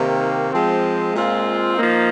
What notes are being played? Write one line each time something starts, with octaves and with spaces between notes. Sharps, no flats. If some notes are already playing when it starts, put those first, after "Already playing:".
Already playing: C3 D#3 A#3
F3 G#3 C4
A#2 G#3 C4 F4
F3 A#3 D#4